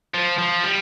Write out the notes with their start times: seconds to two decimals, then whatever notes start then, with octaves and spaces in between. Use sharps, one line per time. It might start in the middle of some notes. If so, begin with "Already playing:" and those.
0.14 F3
0.38 F3
0.64 G3